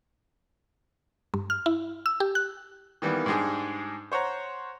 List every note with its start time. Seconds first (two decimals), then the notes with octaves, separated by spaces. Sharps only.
1.34 G2
1.50 F6
1.66 E4
2.06 E6
2.20 G4
2.35 F#6
3.02 D#3 E3 G3 A#3 B3
3.26 G#2 G3 G#3 D4 G#4
4.12 C5 C#5 F#5 A#5